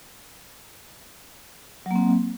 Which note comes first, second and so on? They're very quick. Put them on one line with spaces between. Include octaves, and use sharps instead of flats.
F#3 A#3 C4